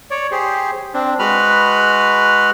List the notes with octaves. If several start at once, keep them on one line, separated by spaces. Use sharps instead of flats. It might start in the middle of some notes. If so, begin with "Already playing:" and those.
C#5 D5
G4 G#4 C5
C4 D4
G#3 F#4 B4 B5 F6